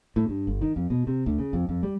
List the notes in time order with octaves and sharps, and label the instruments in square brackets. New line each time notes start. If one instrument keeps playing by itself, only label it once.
[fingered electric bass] A2
G2
G1
D#3
F2
B2
C3
D2
C#3
F2
F2
G3